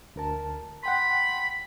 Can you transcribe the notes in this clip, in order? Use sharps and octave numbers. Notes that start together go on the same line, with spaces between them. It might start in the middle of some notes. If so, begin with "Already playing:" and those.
D2 A#4 A5
F#5 G5 B5 C6